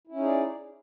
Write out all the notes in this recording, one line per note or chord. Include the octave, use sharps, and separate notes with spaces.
C#4 D#4 E4 G#4 D5